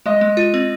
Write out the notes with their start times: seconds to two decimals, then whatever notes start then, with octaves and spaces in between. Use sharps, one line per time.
0.06 G#3 D#5
0.21 G#3
0.37 F4
0.54 C4